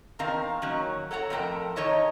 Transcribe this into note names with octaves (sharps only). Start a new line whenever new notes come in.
E2 D#3 C4 A#4 F5
D#3 F#3 A#3 C#4
A4 C#5 F#5 A#5
F2 A2 A4 A#4 G5 A5
D#3 D#4 C#5 D#5 A5